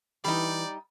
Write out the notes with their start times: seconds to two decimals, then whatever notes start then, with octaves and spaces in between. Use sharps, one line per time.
0.24 E3 G3 D#4 D5 B5